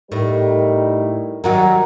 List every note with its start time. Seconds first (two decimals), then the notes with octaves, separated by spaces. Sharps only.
0.12 A2 G3 D#4 A#4
1.44 D#3 F#3 G3 F#4 A#4